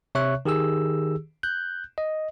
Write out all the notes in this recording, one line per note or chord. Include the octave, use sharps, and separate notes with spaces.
C3 C#5 E5 C#6 F#6
D#3 G4 G#4 E6
F#6 G6
D#5